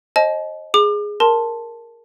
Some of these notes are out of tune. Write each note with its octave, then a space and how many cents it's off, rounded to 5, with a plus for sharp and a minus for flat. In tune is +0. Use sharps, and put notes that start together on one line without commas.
C5 +40 D#5 +0 A5 -40
G#4 +0 D6 +35
A#4 +0 A5 +0 C6 +0